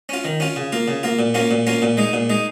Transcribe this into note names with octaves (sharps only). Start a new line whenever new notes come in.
C#4 F4
D#3
C#4 F4
C#3
A#3 F4
C#3
A#3 F4
A#2
A#3 C#4 F4
A#2
A#3 C#4 F4
A#2
G#3 D#4
A#2
G#3 D#4